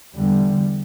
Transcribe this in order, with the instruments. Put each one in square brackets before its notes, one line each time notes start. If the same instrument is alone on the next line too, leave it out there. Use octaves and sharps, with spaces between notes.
[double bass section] E2 D3 G3